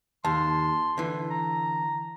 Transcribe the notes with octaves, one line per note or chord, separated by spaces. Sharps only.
D#2 A5 C6
D3 E3
A#5